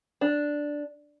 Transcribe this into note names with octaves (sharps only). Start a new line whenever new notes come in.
D4